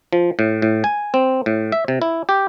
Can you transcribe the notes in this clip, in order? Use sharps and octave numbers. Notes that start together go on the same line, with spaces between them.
F3
A2
A2
G#5
C4
A2
E5
C3
E4
G4